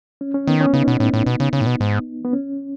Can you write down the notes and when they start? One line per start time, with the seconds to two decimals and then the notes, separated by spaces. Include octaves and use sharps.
0.21 C#4
0.34 C#4
0.47 D#3 B3
0.61 C#4
0.73 C#3 B3 D#4
0.88 B2
1.00 A2
1.14 A2
1.26 B2
1.40 C#3
1.53 C#3
1.61 A2
1.66 B2
1.81 G#2
2.25 B3
2.33 C#4